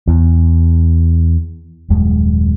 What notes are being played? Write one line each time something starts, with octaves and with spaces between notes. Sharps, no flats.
E2
D#1 F#2 G#3